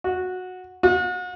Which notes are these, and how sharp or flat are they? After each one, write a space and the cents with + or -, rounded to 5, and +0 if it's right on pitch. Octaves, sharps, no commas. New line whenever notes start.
F#4 -10
F#4 -40